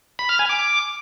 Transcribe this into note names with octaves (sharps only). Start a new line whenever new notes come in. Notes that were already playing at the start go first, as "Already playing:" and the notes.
B5
F6
G#5
D6